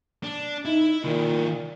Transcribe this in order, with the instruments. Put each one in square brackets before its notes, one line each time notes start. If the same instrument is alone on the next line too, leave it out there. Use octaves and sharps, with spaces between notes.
[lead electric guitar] D4
[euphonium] D#4 [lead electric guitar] E4
[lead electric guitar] C2 D#3 [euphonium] A#2